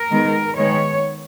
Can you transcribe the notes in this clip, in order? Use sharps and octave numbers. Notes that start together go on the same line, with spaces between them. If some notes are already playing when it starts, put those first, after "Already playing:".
Already playing: A#4
D#3 G#3 B3
D#3 G#3 B3 C#5